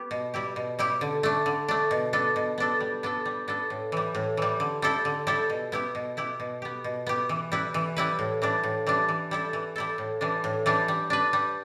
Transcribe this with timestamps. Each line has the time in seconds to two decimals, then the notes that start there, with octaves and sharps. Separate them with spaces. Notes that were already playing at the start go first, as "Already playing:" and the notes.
Already playing: B3 G4
0.11 B2
0.34 G3 E4 G4
0.56 B2
0.79 G3 E4 G4
1.01 D3
1.23 A3 D4
1.46 D3
1.68 A3 D4
1.91 B2
2.13 B3 D4 A4
2.36 B2
2.58 B3 D4 A4
2.80 G3
3.03 B3 D4 A4
3.25 G3
3.48 B3 D4 A4
3.70 A2
3.92 E3 G3
4.15 A2
4.37 E3 G3
4.60 D3
4.82 G3 E4 A4
5.05 D3
5.27 G3 E4 A4
5.50 B2
5.72 B3 E4 G4
5.95 B2
6.17 B3 E4 G4
6.40 B2
6.62 B3 G4
6.84 B2
7.06 B3 G4
7.29 E3
7.52 G3 E4 B4
7.74 E3
7.96 G3 E4 B4
8.19 A2
8.42 E3 G3 D4
8.64 A2
8.86 E3 G3 D4
9.09 E3
9.31 G3 E4 A4
9.53 E3
9.76 G3 E4 A4
9.98 A2
10.21 E3 G3 D4
10.44 A2
10.66 E3 G3 D4
10.88 G3
11.10 D4 B4
11.33 G3